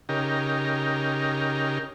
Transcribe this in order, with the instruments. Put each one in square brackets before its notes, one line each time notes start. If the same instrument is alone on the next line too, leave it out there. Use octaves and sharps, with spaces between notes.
[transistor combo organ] C#3 D#4 G4 A#4